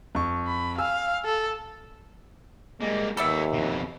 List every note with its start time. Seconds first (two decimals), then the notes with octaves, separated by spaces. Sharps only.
0.15 F2 C#6
0.47 B5
0.78 F5 G#5 E6
1.25 A4
2.81 G3 G#3 A#3
3.17 D#2 G3 B3 A4 E5 G5
3.53 F2 B2